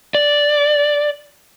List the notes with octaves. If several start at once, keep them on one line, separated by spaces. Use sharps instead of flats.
D5